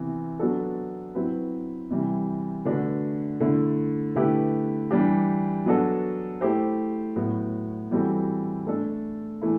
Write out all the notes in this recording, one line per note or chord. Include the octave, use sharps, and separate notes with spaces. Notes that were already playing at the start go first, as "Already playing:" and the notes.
Already playing: C3 E3 B3
F#3 B3 D4 F#4 A4
F#3 C4 E4 B4
C3 E3 G3
D3 A3 D4 F#4 B4
D3 A3 E4
D3 A3 E4 G4 B4
E3 G3 D4 G4
F#3 B3 D4 F#4 A4
A3 E4 G4 C5
A2 F#3 B3 F#4
E3 G3 C4 F#4 A4
A3 D4 A4
E3 A3 E4